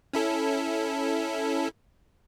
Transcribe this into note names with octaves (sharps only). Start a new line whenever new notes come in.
C#4 E4 A4